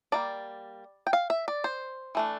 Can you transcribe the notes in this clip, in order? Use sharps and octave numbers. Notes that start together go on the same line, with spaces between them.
G3 A#3 D4 D5
G5
F5
E5
D5
C5
E3 A3 D4